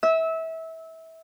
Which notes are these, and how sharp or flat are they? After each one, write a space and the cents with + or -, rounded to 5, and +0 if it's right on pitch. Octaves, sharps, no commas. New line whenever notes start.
E5 -25 E6 -20